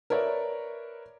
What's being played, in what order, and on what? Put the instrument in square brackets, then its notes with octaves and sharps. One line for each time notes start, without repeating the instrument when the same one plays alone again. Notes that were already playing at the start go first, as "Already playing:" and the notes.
[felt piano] A#4 B4 C#5 D5 E5